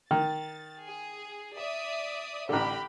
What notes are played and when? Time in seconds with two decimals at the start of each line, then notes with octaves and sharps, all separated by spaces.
0.11 D#3 A6
0.85 G#4
1.58 D5 E5 D#6
2.49 A1 D3 G4 B5